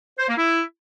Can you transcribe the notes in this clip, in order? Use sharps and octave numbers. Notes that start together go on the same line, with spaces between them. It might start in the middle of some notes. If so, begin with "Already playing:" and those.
C5
A#3
E4